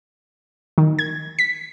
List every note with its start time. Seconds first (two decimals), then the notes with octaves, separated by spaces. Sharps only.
0.78 D#3
0.99 G#6
1.39 B6